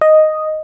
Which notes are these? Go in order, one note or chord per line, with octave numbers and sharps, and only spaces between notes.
D#5